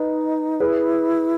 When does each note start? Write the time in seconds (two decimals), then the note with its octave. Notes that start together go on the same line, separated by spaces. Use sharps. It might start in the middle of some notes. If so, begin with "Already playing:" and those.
Already playing: D#4 B4 D#5
0.60 E4 G#4 B4